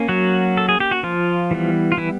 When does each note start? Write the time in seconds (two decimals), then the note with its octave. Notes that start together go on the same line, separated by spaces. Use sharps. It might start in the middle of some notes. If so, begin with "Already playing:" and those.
Already playing: A#3 C#4
0.09 F#3 F#4
0.57 A4
0.69 G#4
0.80 G4
0.91 F#4
1.03 F3 F4
1.51 E3 G3 B3
1.92 F4
1.97 E3 E4